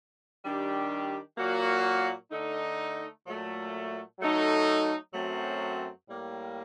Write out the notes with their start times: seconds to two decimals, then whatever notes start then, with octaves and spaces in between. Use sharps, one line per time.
0.44 D#3 G3 D4 G4
1.37 A#2 F#3 A#3 F#4
2.31 D3 A3 D#4
3.26 A#2 F#3 A3
4.19 F#3 A3 D#4 A4
5.14 F#2 F#3 A3 C4
6.07 A2 G3 A#3